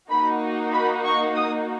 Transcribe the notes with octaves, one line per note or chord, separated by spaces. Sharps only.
A#3 D#4 F#4 B5
B5
C#6
D#6